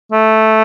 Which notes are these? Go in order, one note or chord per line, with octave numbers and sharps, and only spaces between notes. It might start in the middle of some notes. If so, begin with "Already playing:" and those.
A3